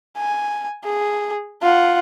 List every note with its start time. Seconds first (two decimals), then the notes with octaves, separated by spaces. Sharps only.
0.17 G#5
0.84 G#4
1.62 F4 F#5